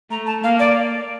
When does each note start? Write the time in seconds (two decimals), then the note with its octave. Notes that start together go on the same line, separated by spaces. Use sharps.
0.11 A3 A#5
0.27 A5
0.44 A#3 F5
0.59 D5